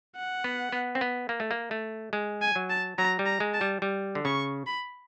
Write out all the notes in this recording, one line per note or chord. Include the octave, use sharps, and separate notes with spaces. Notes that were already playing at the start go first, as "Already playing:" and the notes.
F#5
B3
B3
C4
B3
A#3
A3
A#3
A3
G#3
G#5
F#3
A5
F#3 A#5
G3
A#5
G#3
A5
G3
G3
D3
C#3 C#6
B5